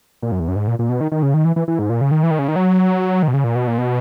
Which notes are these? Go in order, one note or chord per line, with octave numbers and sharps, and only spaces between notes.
A#2
F#2
E2
F#2
G#2
A#2
A#2
B2
D#3
D#3
C#3
D#3
E3
E3
E3
G#2
A#2
C#3
D#3
E3
D#3
C#3
D#3
F#3
D#3
B2
C#3
A#2
B2
A#2
B2